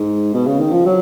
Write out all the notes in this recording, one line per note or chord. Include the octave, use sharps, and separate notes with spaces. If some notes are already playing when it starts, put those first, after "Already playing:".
Already playing: G#2
B2
C#3
D#3
F3
F#3